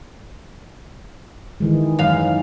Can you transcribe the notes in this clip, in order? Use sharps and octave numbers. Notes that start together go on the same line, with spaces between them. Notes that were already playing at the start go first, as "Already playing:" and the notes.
D#3 E3 G#3
F#2 F5